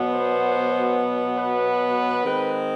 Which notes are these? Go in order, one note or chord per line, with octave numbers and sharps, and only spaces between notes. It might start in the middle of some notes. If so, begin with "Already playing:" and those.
Already playing: B2 F#3 B3
C5
B4
D#3 G#3 C4